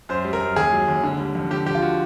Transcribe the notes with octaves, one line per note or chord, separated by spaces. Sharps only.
F#2 C5
G3
A#4
F#2
D#2 G#4
F#3
D#2
D3
G3
F2
D3 G4
F2 G4
F4
F#4